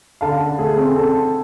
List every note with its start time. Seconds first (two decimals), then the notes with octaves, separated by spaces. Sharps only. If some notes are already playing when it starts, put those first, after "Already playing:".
0.21 D3 F5 A5
0.40 D3
0.58 A3 G#4
0.77 C4 A4
0.96 C4 A4